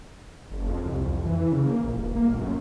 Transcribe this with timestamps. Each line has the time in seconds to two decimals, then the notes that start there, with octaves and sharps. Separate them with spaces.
0.51 F#1
0.69 F2
0.86 C2
1.06 F2
1.25 E3
1.52 C#3
1.66 A#3
1.84 A#1
1.96 D#1
2.15 A#3
2.28 A#1
2.40 F#2